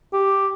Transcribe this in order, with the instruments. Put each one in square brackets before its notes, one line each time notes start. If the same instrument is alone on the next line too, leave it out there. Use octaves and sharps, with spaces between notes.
[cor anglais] G4